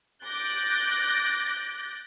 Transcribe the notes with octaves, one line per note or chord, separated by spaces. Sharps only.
D6 F#6 G6 A6 A#6